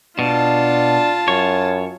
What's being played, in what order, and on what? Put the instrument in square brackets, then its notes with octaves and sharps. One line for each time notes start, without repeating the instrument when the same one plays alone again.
[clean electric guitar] B2 [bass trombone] D4 [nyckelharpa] F4 A5
[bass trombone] F#2 [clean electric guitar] C#5